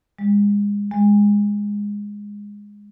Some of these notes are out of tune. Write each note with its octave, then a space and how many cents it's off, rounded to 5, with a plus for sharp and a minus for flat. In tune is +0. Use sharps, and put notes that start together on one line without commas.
G#3 -30
G#3 -15